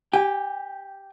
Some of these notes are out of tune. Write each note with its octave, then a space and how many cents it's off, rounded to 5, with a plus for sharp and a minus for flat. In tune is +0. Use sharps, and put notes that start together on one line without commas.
G4 +0 G#5 -30